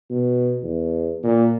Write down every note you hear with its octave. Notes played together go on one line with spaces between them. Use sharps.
B2
E2
A#2